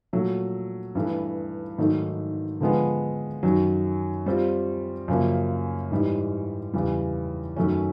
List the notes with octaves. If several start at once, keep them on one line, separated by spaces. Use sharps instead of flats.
A#2 F#3 A3
G2 E3 A3
G#2 D#3 F#3 A3
D3 F3 G#3 B3
F#2 D#3 F#3
G3 C4 F4
F#2 C#3 F3 A#3
G#2 E3 G3
E2 C#3 E3 G3
F#2 D#3 F#3 A3 C#4